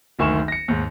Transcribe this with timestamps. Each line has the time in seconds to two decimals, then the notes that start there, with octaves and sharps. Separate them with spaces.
0.19 F#1 D2 D#3 G#5 C#6 E7
0.48 A#6 C#7
0.68 D#2 G#2